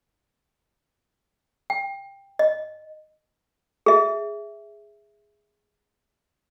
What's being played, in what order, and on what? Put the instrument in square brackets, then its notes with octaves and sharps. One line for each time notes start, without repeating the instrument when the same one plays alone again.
[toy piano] G5
D#5
G#4 E5